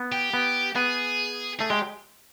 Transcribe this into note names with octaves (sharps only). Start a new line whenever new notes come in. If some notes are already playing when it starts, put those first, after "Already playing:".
Already playing: B3
G4
B3
B3 G#4
A3 G#4
G#3 G4